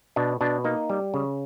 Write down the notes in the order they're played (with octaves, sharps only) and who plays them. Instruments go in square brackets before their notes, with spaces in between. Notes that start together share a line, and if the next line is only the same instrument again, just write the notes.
[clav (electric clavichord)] B2 D4
B2 D4
A#3 D#4
G3
C#3